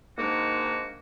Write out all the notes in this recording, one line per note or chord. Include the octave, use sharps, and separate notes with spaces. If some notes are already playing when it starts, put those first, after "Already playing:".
G#2 D#3 G#3 A#3 D4 F#4